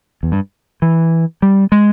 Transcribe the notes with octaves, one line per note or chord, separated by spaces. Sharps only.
E2
G2
E3
G3
G#3